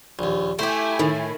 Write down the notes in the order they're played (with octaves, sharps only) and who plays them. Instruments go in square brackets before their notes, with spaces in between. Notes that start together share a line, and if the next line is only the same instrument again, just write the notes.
[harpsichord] A#1 D#2
[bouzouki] A3 G4 [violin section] E4 G#5 [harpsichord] C5
[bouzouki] A2 [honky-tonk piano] D#3